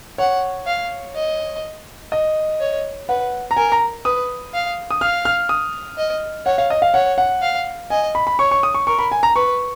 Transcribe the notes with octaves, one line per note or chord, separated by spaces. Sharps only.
C#5 F#5
F5
D#5
D#5
C#5
B4 F#5
A#5
A#4 G#5
A#5
B4 D#6
F5
D#6
F5 F6
F6
D#6
D#5
C#5 F#5
F5
D#5
F5
C#5 F#5
F#5
F5
D#5 G#5
B5
B5
C#5 C#6
C#6
D#6
C#6
A#4 C#6
B5
G#5
A#5
B4 C#6